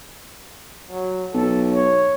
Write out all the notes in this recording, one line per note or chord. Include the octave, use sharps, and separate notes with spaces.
F#3
B1 A4
C#5